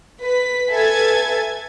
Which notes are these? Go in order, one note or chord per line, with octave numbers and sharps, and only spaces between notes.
B4 B6
A4 B4 E5 G#5 G#6 A6